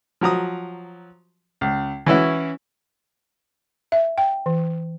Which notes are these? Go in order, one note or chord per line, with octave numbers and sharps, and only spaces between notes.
F3 F#3 A#5 D#6
C#2
E3 C#4 E4 F#4
E5
G5
E3